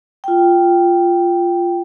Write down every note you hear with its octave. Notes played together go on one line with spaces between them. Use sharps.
F4 G5